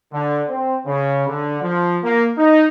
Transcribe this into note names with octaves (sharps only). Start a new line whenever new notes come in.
D3
C4
C#3
D3
F3
A#3
D#4